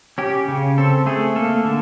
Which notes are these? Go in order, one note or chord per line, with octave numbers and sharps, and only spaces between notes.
C#4 G4
C#3
C4 A4
A3 G#4
A#3 A4
D3